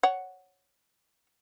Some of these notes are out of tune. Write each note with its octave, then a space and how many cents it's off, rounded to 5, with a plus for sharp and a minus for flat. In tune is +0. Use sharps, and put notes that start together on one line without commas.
C#5 +0 F#5 +0